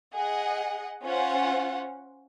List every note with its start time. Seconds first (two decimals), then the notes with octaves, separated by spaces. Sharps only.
0.14 G#4 D#5 F#5
1.03 C#4 F4 C5 F#5